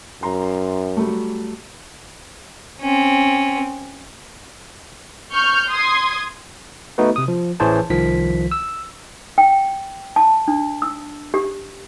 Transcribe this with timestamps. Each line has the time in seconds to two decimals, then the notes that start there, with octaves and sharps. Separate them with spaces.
0.23 F#2 A#5 C6
0.97 F#3 G3 A3
2.81 C4 C#4
5.32 C#6 F6 G6
5.68 C6 D#6 G#6
6.98 A3 B3 D#4 F#4 B4
7.16 C3 D#6
7.28 F3
7.60 A1 E3 G#4 C5 C#5 A5
7.90 C2 D#3 F3 B6
8.51 E6
9.38 G5
10.16 A5
10.48 D4
10.82 E6
11.34 G4